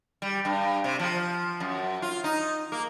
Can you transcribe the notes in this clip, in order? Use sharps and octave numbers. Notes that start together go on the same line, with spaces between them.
G3
G2
C3
F3
F#2
F4
D#4
A#3